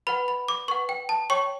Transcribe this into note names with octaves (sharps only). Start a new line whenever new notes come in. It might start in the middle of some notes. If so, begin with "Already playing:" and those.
B4 F#5 B5
B5
D6
B4 F#5 C#6
G5
A5
C#5 G5 C#6